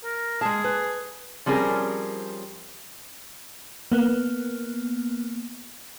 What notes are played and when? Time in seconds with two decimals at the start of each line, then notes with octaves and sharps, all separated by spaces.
0.04 A#4
0.41 G#3 G#4 A5
0.64 B4
1.46 F3 G3 C4 C#4 G#4 A#4
3.92 A#3 B3